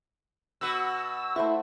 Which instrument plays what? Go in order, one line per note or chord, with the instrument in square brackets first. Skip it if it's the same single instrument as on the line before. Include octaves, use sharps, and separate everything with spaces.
[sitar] B2 F#4 B4 [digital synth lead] E6
[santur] A3 C5 F#5 [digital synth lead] E4 [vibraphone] E5 B5